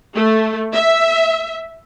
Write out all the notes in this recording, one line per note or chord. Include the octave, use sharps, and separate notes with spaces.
A3
E5